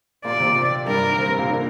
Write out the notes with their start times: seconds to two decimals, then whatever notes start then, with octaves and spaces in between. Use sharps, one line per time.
0.25 A#2 A#3 D5
0.40 C3 C4
0.87 G2 G3 A#4
1.18 C3 C4
1.29 C3 C4
1.39 A#2 A#3
1.49 D3 D4